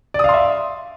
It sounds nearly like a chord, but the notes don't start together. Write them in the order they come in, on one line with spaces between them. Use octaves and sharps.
D5 D#6 F5 C6 E5